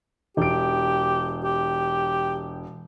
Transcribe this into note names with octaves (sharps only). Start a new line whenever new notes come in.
E1 G4 D7
G4